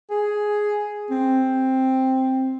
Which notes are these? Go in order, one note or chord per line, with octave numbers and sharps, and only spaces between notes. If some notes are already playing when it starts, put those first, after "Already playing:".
G#4
C4